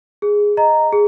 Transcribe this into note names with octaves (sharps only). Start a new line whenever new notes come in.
G#4
D#5 A#5
G#4